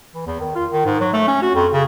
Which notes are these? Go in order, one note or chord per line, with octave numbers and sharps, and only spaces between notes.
E3
E2
D#3
F4
D#3
G#2
F#3
A3
C#4
F#4
F2
C#3